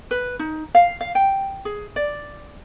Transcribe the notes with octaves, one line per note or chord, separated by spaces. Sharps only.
B4
D#4
F5
F5
G5
G#4
D5